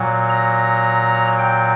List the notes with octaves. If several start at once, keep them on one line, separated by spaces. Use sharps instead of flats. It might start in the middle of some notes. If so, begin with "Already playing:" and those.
Already playing: A#2 F#3
A#5
G5